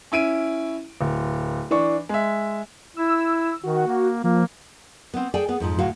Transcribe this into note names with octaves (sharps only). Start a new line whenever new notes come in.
C#4 E4 D7 D#7
D1
E3 D4 C#6
G#3 E5
E4 E6
D#3 F#4
A#3
F3 A#3
B3 C4
G#4 A4 D5 G5 G#5
B3 G#4
F2 G#2 F3
D2 A2 F#4 F5